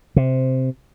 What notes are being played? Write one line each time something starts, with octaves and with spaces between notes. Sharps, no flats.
C3